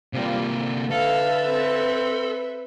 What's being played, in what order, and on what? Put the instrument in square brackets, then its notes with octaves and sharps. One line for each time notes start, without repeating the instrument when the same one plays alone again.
[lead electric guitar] C3 A#3 [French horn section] F3 G3
[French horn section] D3
[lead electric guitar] A4 [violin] B4 E5 [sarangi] F5
[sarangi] C4